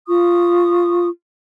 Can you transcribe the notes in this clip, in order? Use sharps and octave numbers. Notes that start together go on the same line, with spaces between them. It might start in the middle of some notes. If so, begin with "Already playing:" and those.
F4 C#6 D#6